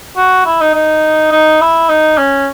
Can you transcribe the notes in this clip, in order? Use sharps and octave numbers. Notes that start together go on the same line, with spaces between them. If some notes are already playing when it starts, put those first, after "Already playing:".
F#4
E4
D#4
D#4
D#4
E4
D#4
C#4